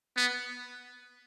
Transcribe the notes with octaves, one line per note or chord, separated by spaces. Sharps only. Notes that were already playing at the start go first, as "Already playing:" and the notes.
B3